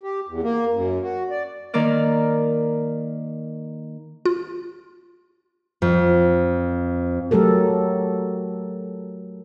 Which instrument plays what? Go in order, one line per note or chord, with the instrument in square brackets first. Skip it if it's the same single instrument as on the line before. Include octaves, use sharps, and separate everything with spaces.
[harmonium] G4
E2
A#3
F#2
F#4
D5
[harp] D#3 A#3 A#4 D5 F6
[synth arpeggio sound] F4
[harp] F2
[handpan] F#3 A3 G4 A4 A#4